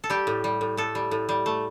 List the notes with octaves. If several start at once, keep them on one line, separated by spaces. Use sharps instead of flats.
A4
G3 G4
A2
G3
A2
A2 A4
G3
A2
G3
A3